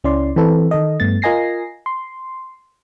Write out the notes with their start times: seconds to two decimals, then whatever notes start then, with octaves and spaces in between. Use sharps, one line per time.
0.04 C#2 C#4 E4 D5 C6
0.36 E3 C4 A4 B4
0.71 D#3 A4 D#5
1.00 G2 A3 B3 A6
1.22 F4 A#4 D#5 G#5 A#6 C7
1.86 C6